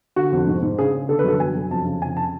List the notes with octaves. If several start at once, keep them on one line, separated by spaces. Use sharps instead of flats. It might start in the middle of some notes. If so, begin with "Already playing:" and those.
D3 F#4
F2
G#2
G#2
C#3 G#4
C#3
D3 A4
B4
F#2 A4
F#2 G#5
F#2
F2 A5
C#3
F2 G#5
C#3 A5